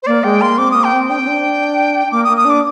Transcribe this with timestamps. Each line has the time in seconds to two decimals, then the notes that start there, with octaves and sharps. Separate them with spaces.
0.03 C5
0.07 A#3 D5
0.24 G#3 G5
0.41 A#3 C6
0.58 C4 D6
0.71 A#3 D#6
0.84 G5
0.93 C4
1.10 D4 G5
1.18 C4
1.28 D4
2.11 A#3 D6
2.24 A#3 D#6
2.37 D#6
2.45 D4 D6